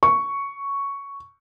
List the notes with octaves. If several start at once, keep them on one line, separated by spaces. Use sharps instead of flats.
C#6